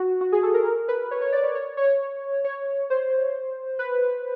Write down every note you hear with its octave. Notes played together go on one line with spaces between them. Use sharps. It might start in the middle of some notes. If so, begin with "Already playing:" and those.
Already playing: F#4
F#4
G#4
A4
A#4
A#4
B4
C#5
C#5
D5
C#5
C#5
C#5
C#5
C5
B4